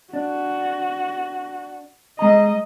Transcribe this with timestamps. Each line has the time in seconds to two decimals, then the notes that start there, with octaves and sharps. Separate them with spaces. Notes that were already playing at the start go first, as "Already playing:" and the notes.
0.13 D4 F#4
2.19 G#3 D#5 A#5